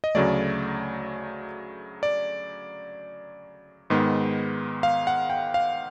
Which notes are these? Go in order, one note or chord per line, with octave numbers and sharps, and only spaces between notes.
D#5
D2 C#3 F#3 A3 D5
D5
G#2 D#3 G#3 B3
F5
F#5
G5
F5